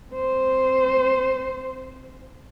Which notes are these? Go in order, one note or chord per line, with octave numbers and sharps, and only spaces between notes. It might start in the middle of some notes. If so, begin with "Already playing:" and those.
C4 C5